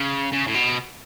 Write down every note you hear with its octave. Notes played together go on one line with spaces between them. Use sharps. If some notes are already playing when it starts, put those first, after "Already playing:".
Already playing: C#3
C#3
A2
B2